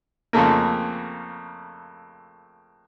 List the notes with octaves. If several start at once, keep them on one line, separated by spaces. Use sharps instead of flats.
F2 C#3 A3 A#3